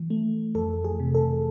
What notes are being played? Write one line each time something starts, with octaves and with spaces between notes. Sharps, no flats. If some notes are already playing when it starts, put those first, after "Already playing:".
Already playing: E3
A3
F2 A4
G#4
C3
A4